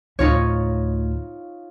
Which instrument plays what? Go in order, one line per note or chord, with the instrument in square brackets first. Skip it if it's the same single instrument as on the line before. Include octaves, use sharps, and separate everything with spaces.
[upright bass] D2 A2 [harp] D#4 F4 C#5